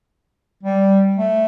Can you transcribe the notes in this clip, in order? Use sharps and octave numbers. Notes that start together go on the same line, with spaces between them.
G3
A3